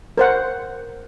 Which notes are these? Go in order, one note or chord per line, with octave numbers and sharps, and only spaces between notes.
A#4 C5 F#5